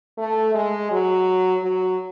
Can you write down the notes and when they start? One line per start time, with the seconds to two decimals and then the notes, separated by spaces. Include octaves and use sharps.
0.18 A3
0.54 G#3
0.91 F#3
1.64 F#3